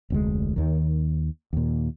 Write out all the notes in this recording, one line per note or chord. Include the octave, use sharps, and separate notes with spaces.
F1 D2 G#3
D#2 D#3
D#2 A#2